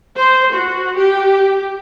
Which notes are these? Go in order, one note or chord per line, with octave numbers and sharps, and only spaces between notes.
C5
F#4
G4